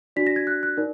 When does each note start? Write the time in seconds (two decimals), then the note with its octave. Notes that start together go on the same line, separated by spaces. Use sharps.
0.16 D4 F#4 D5 B6
0.27 A#6
0.36 G#6
0.47 F#6
0.63 F#6
0.77 D#4 A#4 D5